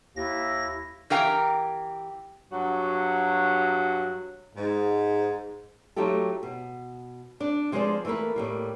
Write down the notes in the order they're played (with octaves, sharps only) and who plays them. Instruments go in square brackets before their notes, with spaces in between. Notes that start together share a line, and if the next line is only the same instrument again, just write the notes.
[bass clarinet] D#2 [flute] E4 [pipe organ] A#6
[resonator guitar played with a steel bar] E3 G4 A#4 F5 G5 A#5
[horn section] G2 F#3 F#4 F#5
G#2
[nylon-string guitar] F#3 A3 D#4 F4 G4 A4
B2
D4 D5
F3 G#3 F4 B4 C5 D5
E3 A3 A#3 A#4 B4
A2 G3 A#3